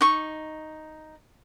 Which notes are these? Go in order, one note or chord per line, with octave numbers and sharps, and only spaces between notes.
D#4 C#6